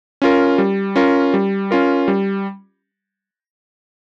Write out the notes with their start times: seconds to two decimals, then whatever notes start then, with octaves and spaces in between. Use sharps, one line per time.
0.22 C#4 F4 A#4
0.58 G3
0.96 C#4 F4 A#4
1.34 G3
1.71 C#4 F4 A#4
2.08 G3